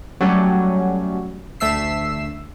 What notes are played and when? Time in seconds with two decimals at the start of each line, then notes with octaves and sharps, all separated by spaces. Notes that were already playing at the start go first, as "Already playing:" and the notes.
0.21 F#3 G3 A3 C#4
1.60 D2 A3 E5 E6 C7